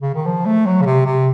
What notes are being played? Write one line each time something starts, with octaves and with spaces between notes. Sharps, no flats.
C#3
D#3
F3
A3
F#3
C#3
C3
C3